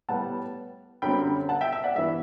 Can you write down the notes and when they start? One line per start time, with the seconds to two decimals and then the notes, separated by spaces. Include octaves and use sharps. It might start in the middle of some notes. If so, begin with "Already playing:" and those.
0.09 A2 G3 B3 F#5 A5
1.02 F#2 D3 G3 C4 G5 B5
1.49 F#5 A5
1.61 E5 G5
1.72 E5
1.84 D5 F#5
1.95 G2 E3 B3 E5